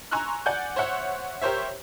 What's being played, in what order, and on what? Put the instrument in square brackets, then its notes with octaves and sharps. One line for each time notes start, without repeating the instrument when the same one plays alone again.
[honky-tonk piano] G#5 A#5 C6 C#6 E6 F#6
D5 F#5 G#5 G6
C5 C#5 E5 F#5
G4 A#4 C5 C#5 E5